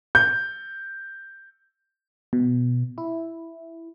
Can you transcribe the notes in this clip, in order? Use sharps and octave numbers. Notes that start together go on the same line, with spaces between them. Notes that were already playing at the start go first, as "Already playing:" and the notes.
G6
B2
E4